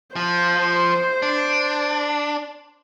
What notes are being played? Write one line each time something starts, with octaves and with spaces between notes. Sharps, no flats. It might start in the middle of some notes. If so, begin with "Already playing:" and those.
F3 C5
D4